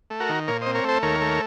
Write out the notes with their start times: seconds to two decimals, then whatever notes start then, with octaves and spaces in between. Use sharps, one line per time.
0.10 A3
0.20 F#4 A#4
0.29 D#3
0.47 A#2 A#4 C#5
0.61 C4 C5 D#5
0.74 A#4 C#5
0.84 A3 A4 C5
1.03 D#2 A#4 C#5
1.21 A3